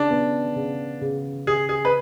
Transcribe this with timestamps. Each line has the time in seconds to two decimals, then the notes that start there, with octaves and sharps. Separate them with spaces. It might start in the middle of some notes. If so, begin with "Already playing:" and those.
Already playing: C#3 D4
0.10 B3
0.56 C#3
1.01 C#3
1.47 C#3 G#4
1.69 G#4
1.85 B4